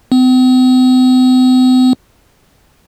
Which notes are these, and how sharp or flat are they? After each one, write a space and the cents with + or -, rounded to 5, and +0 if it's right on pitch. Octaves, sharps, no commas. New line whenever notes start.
C4 -45